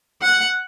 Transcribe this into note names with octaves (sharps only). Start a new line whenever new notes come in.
F#5